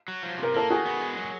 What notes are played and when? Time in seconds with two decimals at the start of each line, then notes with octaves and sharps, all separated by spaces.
0.08 F#3
0.23 F3
0.39 C3 A#4
0.54 A#3 A4
0.70 D#3 F#4 G#4
0.85 B3
1.01 G#3
1.17 F#3